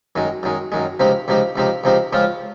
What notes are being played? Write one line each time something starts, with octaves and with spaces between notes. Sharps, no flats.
F#2 D#3 G#3
F#2 D#3 G#3
F#2 D#3 G#3
C#2 C3 F3 C4 D#4
C#2 C3 F3 C4 D#4
C#2 C3 F3 C4 D#4
C#2 C3 F3 C4 D#4
C#2 C#3 F3 C4 F4